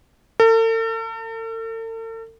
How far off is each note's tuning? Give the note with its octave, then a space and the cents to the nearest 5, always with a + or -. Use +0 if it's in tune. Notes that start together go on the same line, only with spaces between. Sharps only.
A4 +45